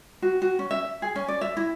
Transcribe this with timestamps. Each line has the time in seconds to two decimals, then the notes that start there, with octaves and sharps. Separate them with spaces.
0.22 F#4
0.42 F#4
0.59 C#4
0.71 E5
1.02 G#4
1.16 C#4
1.28 D5
1.41 E5
1.57 E4